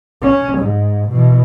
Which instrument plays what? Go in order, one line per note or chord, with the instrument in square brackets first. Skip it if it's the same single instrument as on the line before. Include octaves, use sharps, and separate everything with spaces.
[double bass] C#4
G#2
B2 E3